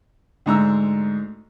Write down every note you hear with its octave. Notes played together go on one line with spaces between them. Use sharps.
D2 G#2 A#5 E6